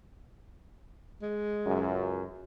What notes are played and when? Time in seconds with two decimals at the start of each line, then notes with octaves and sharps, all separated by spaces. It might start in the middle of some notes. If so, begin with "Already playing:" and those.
1.22 G#3
1.65 C#2 F#2